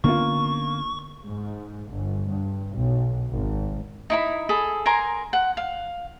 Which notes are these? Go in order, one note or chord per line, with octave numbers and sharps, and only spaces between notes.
D3 A#3 B3 C#4 F4 C#6
G#2
G1
G2
B1
G#1
D#4 E4 B5
G#4 A4 B5
A#4 G#5 A#5 C6
F#5
F5